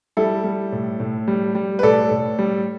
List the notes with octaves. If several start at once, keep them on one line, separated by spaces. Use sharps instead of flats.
G3 E4 A4
G3
A2
A2
G3
G3
B4
A2 A4 D5
A2
G3